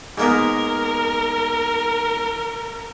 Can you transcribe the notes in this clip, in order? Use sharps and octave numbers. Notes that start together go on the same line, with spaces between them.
G#2 A#3 B3 A#4